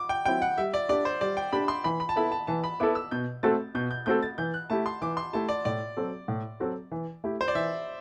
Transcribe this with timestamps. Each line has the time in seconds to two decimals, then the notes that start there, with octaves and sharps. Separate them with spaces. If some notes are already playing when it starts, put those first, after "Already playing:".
Already playing: D6
0.09 G5
0.25 F#3 C4 E4 G5
0.42 F#5
0.58 G3 E5
0.74 D5
0.89 D4 G4 D5
1.05 C5
1.21 G3 D5
1.37 G5
1.53 D4 G4 B5
1.68 C6
1.84 E3 B5
2.00 B5
2.09 A5
2.16 B3 E4 A4 B5
2.32 A5
2.47 E3 A5
2.64 B5
2.80 B3 E4 A4 D6
2.95 E6
3.11 B2 G6
3.43 A3 C4 F#4 A4 A6
3.75 B2 G6
3.91 G6
4.06 A3 C4 F#4 A4 G6
4.23 A6
4.38 E3 G6
4.54 F#6
4.70 A3 E4 G4 A5
4.86 C6
5.02 E3 D6
5.17 C6
5.33 A3 E4 G4 A5
5.49 D5
5.65 A2 D5
5.97 F#3 C4 F#4 A4
6.28 A2
6.60 F#3 C4 F#4 A4
6.91 E3
7.24 A3 E4 G4
7.41 C5
7.48 D5
7.55 E3 E5